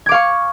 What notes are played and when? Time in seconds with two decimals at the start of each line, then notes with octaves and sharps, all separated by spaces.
0.06 G#6
0.09 D6
0.11 F5
0.14 C#6